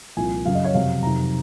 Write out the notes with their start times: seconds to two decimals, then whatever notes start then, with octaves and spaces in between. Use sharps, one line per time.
0.17 C2 A#2 F3 G#5
0.45 F#2 C#3 F#3 F5
0.55 D#5
0.64 C#5
0.74 F2 C3 F#3 F5
1.03 F2 C3 D#3 F#3 A#5